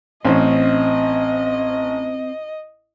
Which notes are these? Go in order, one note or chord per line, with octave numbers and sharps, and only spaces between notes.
A1 C4 C#4 C5 D#5